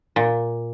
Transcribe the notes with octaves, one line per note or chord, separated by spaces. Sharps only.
A#2